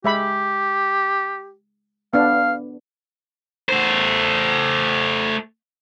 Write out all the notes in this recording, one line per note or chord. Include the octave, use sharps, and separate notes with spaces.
G#3 G4 E5 B5
B3 D4 F5
A3 C5